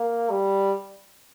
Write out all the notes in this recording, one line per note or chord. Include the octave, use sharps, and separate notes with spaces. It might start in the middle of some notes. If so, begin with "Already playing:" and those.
Already playing: A#3
G3